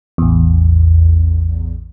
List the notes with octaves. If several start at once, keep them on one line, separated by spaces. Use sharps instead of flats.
A1 E2